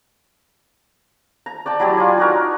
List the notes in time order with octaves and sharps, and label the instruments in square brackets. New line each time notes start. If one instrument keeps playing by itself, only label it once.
[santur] A#5
D5 G5 A5
F#3 E4 G4 D5
F4 G#5
D#4 F#4 A#4